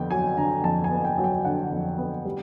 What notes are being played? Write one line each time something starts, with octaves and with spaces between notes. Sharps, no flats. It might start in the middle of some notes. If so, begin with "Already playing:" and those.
Already playing: F2 D3 B3 G5
F#3 G#5
D3 A#5
F2 A5
G#5
B3
G5
F#3
G5
D3 F#5
F2
B3
G3